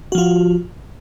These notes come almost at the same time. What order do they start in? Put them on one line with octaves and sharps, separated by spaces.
F#4 F3 F4